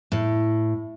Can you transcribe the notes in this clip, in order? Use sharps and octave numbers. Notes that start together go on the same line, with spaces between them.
A2